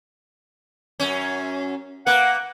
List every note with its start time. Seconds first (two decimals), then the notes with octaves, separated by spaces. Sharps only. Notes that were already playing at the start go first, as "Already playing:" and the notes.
1.00 F#2 C#4
2.06 A#3 B4 F#5